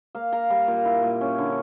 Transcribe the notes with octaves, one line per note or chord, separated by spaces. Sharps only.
A#3 F5
A#3 A#5
G3 A#5
A#2
E4
A#2
C#4
D3